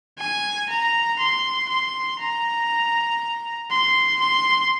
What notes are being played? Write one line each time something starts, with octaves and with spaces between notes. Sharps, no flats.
G#5
A#5
C6
C6
A#5
C6
C6